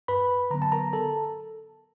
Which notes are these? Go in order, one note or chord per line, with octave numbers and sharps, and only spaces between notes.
G2 B4 B5
D3 F#3 B3 A#5
A5
A#4 A#5
A4 A5